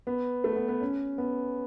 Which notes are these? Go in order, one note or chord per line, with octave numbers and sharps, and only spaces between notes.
B3
A3
B3
B3
C#4
B3